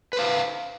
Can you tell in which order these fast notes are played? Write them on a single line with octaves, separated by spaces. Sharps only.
B4 C5 F5